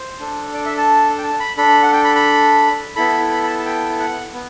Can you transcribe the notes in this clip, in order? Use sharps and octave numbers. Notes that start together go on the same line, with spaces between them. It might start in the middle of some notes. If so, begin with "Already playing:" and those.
Already playing: C5
D4 A4
D5
E5
A5
G5
A5
B5
D4 A4 B5
F#5
G5
B5
B5
B3 E4 A4 B5
B5
B5
A5
A5
G5
F#5
B3